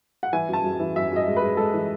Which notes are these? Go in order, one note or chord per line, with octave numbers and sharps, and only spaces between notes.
F#5
E3 G#5
F#2
A5
F#2
E3
F#2 E5
F#2 D#5
G#3
B4
G#3
G#3 A4
E3